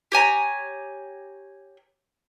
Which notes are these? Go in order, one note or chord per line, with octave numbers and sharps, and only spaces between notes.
G4 C#5 G#5 A#5